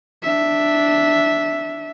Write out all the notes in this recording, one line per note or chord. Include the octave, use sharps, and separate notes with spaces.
D4 E5